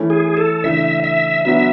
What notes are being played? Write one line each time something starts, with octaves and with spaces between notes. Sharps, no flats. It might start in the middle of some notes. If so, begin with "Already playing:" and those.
Already playing: E3 A3 C#4 E4
G#4
A4
C#3 E3 A3 D4 E5
E5
F#3 B3 D4 F#4 E5